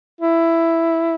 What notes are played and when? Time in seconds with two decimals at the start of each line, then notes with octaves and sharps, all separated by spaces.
0.21 E4